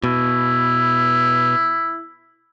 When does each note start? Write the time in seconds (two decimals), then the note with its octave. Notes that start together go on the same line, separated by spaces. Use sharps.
0.04 B2 E4